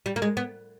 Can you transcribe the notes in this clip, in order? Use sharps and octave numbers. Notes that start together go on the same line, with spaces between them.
G3
A#3
G#3
B3